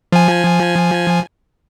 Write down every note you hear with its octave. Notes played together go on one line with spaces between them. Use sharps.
F3 G#5